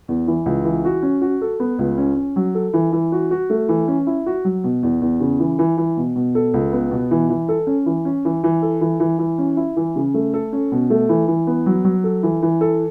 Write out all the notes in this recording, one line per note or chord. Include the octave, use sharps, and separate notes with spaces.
E2
E3
C#2
E3
F#4
C#4
F#4
A4
B3
C#2
C#4
C#4
F#3
A4
E3
E3
F#4
F#4
A3
E3
C#4
E4
F#4
F#3
B2
E2
E2
C#3
E3
E3
E3
B2
B2
A4
C#2
B3
B2
E3
E3
A4
C#4
E3
C#4
E3
E3
A4
E3
E3
E3
C#4
E4
E3
C#3
A3
A4
C#4
B2
A3
E3
E3
B3
F#3
F#3
A4
E3
E3
A4